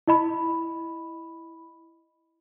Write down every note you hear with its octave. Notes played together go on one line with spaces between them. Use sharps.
E4 D#5 B5